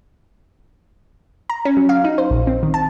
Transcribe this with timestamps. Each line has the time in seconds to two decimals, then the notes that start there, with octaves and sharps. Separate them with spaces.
1.50 A#5
1.65 C#4
1.77 F#3
1.89 F5
2.04 D#4
2.18 C5
2.30 A#1
2.47 C4
2.63 D#3
2.74 A5